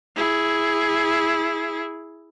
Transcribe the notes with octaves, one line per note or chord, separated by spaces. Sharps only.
E4 G#4